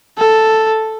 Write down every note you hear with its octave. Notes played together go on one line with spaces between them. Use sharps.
A4